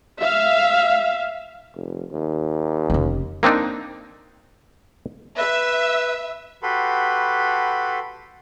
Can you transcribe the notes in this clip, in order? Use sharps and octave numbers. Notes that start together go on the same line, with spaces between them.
E5 F5
F1
D#2
F1 C#4
A#3 C4 D4 D#4
B4 E5
F#4 G4 A4 B4 B5 C6